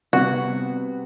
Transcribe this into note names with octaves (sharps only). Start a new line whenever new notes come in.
C3 G3 B3 F#4